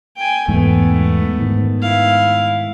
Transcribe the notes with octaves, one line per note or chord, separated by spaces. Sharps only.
G5 G#5
E2 G#2 A3 B3
G#2 D#3
E4 F5